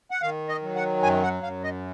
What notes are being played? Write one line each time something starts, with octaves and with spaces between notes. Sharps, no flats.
F#5
D#3 F5
D#5
F#3
F#5
F#2 G#5
F#5
F#2 F5
D#5